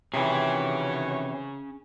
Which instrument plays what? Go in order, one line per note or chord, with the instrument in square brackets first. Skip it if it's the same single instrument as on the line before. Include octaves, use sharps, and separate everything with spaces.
[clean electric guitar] C3 E3 [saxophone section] D#3 F#4 C#5 [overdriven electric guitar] C#4 G#4